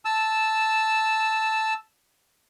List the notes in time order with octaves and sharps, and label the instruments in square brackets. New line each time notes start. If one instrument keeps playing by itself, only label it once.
[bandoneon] A5 E6